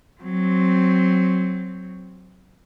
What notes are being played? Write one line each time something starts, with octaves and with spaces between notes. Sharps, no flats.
F#3 C4